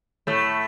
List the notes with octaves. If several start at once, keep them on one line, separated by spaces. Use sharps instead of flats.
A2 A3